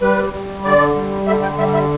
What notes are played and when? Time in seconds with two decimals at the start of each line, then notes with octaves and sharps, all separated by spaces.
0.02 G3 B4
0.33 G3
0.64 D3 D5
0.96 G3
1.27 D3 E5
1.43 G5
1.59 G3 E5
1.74 E5